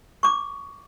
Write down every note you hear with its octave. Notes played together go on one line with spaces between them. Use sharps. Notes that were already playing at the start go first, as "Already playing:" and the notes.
C#6 D6